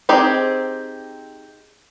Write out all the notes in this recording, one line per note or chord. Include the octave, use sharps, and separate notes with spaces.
C4 D#4 G4 G#4